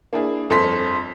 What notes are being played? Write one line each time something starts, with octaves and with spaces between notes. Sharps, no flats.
A#3 D4 E4 G#4
G1 F2 A4 C5 C6 B6